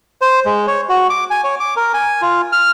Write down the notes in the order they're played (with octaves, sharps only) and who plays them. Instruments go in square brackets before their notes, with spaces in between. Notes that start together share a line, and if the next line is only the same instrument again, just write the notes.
[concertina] C5
G#3
C#5
F#4
D6
G#5
C#5
D6
A#4
G#5
F4
F6